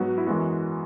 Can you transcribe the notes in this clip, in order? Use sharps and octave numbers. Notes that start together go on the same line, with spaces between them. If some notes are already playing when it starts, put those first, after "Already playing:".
Already playing: G#2 F#3 B3 F#4
E4
F#2 E3 G#3 B3 F#4